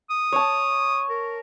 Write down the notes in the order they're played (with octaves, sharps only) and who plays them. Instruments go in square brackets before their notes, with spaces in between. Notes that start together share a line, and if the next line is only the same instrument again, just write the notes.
[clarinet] D#6
[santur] C#5 A5
[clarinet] A#4